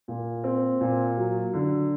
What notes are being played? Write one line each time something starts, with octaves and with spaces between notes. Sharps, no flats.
A#2
C4
A#2
F#3
D3